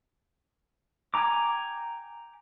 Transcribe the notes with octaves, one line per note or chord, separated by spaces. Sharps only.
G5 G#5 A#5 D6